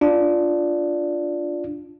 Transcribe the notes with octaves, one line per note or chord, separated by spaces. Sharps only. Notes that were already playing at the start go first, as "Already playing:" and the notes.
D4 F4